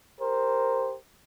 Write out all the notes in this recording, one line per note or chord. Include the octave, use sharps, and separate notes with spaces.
G4 A#4 C5